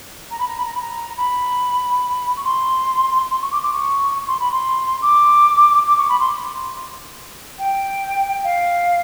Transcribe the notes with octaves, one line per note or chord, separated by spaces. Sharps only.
A#5
B5
A#5
B5
A#5
B5
A#5
B5
C#6
C6
C6
C#6
D6
D6
C#6
C#6
C6
B5
C6
D6
D6
C#6
B5
C6
G5
F5